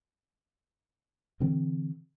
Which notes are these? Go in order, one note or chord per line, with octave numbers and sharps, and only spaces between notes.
B2 D3 E3 C4